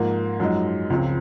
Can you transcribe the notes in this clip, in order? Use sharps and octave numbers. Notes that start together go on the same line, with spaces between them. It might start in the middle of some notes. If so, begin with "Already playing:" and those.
Already playing: G#2 F3 A#3
F#2 F3 G#3 D#4
C#2 C#3 F3 C4 F4